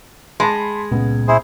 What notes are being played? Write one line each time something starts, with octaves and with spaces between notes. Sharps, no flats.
G#3 A5 B5 C6
C#2 A#2 B3
E4 G#4 C5